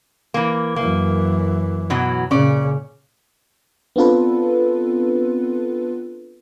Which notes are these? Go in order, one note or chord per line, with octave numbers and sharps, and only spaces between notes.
E3 A#3
F#2 E3 A#3
B2 E3 F#3
A#2 C#3 C#4 D5
B3 C4 D4 F4 A4 B4